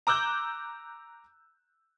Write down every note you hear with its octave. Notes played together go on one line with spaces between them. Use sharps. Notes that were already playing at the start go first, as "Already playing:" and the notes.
A#5 D6 E6 F#6 G6